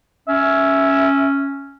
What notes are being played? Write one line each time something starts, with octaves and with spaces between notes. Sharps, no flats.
C#4 E5